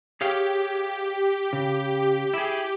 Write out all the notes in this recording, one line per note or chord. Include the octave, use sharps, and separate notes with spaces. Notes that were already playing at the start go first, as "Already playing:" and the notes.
G4 G#4 C#5 F5
C#3
E4 G#4